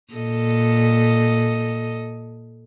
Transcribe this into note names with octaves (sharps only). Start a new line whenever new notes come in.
A#2 A4 D#5